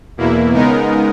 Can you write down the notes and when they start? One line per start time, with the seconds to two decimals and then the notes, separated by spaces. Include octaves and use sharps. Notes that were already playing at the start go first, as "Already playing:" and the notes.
0.17 E2 B2 A#3 E4
0.53 C#3 G#3 B3 D#4 A#4